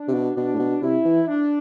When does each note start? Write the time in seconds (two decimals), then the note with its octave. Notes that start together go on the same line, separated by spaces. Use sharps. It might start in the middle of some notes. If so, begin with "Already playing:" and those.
Already playing: D4
0.08 C3
0.14 B2
0.36 B2 D4
0.54 A2
0.60 B2
0.82 C3 E4
1.05 E3
1.28 D4